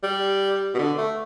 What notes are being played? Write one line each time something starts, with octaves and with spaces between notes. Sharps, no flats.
G3
B2
D3
A3